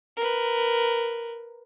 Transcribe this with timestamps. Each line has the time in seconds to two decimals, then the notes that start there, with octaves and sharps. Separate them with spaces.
0.17 A#4 B4